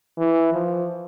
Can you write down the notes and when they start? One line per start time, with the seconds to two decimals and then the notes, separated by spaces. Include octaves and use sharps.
0.18 E3
0.53 F3